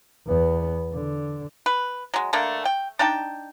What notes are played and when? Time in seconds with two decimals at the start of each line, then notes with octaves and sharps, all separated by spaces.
0.27 E2 B3
0.93 D3
1.66 B4
2.14 F#3 G#3
2.33 D3 A3 A#3 D4
2.65 G5
2.99 D4 D#4 G5 A5